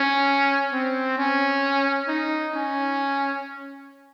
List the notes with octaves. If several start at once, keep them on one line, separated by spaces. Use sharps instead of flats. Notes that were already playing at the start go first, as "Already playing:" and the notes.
Already playing: C#4
C4
C#4
D#4
C#4